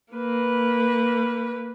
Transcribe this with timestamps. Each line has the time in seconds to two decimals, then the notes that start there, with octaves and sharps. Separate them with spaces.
0.13 A#3 B4